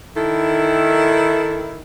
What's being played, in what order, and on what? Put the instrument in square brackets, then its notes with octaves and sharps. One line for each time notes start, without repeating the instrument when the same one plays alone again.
[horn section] D#3 E4 [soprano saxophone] A4